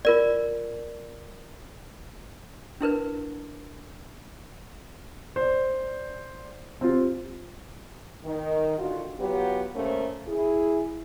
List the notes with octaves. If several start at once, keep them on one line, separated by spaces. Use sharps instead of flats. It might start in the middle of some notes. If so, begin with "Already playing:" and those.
F4 A#4 D5
D4 E4 A#4 B4
C5 D5
C4 F4 G4
D#3
D3 D#3 F4 F#4
F#3 B3 F4 G4
C#3 A3 A#3 C#4 A#4 C5
E4 G#4